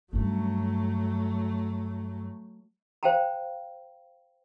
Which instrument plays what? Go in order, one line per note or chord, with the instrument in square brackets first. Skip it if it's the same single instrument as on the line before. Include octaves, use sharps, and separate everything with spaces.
[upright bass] G2 C#4 [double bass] F#3 A3
[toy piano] C5 F5 G5 A5 A#5